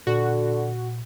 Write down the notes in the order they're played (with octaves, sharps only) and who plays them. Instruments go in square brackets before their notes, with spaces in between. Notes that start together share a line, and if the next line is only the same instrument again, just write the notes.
[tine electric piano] A#2 [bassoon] D3 [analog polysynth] F#4